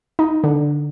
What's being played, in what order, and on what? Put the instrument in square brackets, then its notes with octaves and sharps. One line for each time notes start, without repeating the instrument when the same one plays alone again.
[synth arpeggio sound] D#4
D3